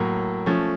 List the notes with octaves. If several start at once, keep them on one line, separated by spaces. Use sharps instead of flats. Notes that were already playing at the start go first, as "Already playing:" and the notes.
Already playing: A2 F#3 A#3
F3 A3 C#4